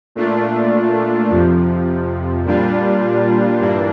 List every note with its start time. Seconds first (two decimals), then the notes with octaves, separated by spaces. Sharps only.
0.15 A#2 A3 D4 F4
1.31 F2 C3 F3
2.45 A#2 G3 D4 F4
3.61 G2 E3 A#3 D4